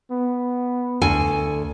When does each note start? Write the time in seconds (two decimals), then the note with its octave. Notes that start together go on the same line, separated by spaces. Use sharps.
0.11 B3
1.02 D2 A4 G#5